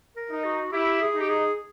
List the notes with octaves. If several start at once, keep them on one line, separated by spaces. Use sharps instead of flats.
A#4
D#4
F#4
E4 G4
G#4
D#4
G4
G#4